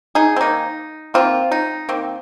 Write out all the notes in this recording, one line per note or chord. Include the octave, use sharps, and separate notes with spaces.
D#4 G#4
C4
D#3 A#3 D#4
D#3 A#3 C4 F4
D#4
D#3 A#3 C4